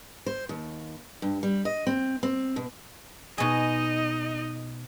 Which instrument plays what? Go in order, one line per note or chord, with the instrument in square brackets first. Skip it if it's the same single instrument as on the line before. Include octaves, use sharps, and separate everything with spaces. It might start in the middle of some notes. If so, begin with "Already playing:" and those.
[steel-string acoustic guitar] C5
D#2
G2
G3
D#5
C4
C4
B2
[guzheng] B2 G#4 [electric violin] D#4 D#5